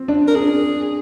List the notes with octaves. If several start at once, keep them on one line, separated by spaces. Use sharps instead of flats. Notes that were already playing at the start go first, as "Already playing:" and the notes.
Already playing: C4
D4
A#4
D4 G#4